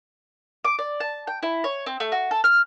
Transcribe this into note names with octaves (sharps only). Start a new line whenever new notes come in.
D6
D5
A5
G5
E4
C#5
C4
A3
F#4
A4
F6